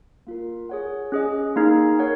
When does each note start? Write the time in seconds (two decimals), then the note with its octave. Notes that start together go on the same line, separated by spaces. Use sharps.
0.27 A#3 F4 A#4
0.69 G#4 C#5 F#5
1.12 C#4 G#4 D#5
1.56 A#3 D#4 G#4
1.99 A#4 C#5 F#5